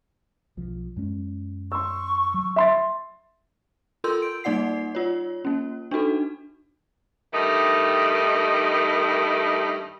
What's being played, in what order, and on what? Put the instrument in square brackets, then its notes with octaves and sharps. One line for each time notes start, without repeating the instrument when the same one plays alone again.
[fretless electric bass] B1 F3
F#2 G#3 C#4
[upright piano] C6 E6 [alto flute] C#6
[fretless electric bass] F#3
[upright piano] E5 C6 A6
[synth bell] F4 A4 A#4 C6 E6 G6
D7
G3 A#3 D#4 D5 F#5 C7
F4 C#5
A#3 C#4
D4 D#4 F#4 A4
[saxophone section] G2 D#3 A3 D#4